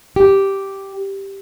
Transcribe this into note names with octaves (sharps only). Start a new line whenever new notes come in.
G4